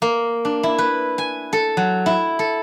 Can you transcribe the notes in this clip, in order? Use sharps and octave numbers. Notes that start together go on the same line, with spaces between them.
A#3
D4
E4
B4
G#5
A4
F#3
E4
A4